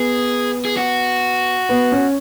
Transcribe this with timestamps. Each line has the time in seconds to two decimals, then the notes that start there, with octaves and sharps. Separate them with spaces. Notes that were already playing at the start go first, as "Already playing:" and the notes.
Already playing: B3 G#4
0.65 G#4
0.77 F#4
1.69 B3
1.92 C#4